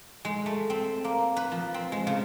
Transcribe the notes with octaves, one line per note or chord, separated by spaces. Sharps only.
G#3
A3
C4
A#3
B4
F3
C4
G#3
C#3